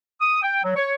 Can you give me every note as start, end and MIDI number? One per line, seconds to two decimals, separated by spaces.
0.21 0.41 87
0.43 0.61 79
0.64 0.73 54
0.76 0.94 73